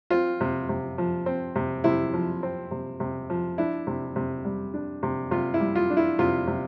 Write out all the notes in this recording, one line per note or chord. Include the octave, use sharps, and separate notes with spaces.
C4 F4
C3
C3
F3
C4
C3
C3 E4
F3
C4
C3
C3
F3
D4 E4
C3
C3
G3
D4
C3
C3 F4
E4
G3
F4
D4
E4
C3 F4
C3